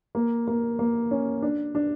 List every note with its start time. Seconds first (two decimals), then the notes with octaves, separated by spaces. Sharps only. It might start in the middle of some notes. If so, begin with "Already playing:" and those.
0.15 A#3
0.47 A#3
0.79 A#3
1.11 C#4
1.42 D4
1.75 D4